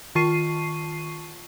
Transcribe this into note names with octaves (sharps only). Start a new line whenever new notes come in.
D#3 F4 A5 C#6 C7 D#7